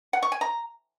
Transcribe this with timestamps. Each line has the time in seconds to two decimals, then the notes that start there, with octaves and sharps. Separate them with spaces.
0.13 F#5
0.23 C#6
0.32 G#5
0.41 A#5